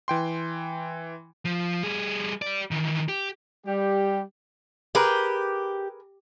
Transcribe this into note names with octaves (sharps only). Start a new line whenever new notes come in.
E3 G5 C6
F3
G3 G#4
G4 D5
D#3 E3
G4
G3 G4
G4 G#4 A#4 B4